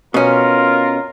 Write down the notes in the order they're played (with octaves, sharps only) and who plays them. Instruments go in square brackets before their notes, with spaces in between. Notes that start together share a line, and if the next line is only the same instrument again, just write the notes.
[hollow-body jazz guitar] B2 C#4 [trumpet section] F4 A#4